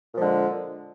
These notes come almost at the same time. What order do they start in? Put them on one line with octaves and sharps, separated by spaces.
A#2 F3 G#3 D3